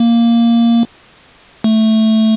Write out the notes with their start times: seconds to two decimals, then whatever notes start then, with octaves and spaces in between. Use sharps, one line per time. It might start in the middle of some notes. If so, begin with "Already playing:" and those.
Already playing: A#3
1.64 A3